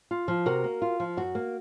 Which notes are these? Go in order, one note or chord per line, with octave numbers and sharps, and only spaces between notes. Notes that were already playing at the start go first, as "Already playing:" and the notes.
F4
F3
C3 F#4 A#4
A#3
F4
F3
F#2 F#4
A#3